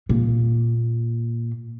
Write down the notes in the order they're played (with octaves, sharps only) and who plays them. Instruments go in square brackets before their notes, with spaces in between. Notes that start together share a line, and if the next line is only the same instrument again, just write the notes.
[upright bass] A#2